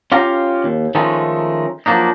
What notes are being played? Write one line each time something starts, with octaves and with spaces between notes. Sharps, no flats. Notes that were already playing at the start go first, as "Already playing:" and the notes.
C#4 F4 G4 F5 A#5
D#2
D#3 F3 G#3 A3 C#4 D#4
F3 F#3 A#3 D4 D#4